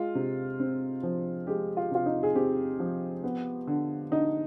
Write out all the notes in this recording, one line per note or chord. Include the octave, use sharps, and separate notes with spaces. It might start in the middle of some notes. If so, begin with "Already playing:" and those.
Already playing: G#3 F4
C3
C4
F3
G#3 G4
F4
C3 F4
D#4
G#4
C4 G4
F3
B3
D3
D3 D#4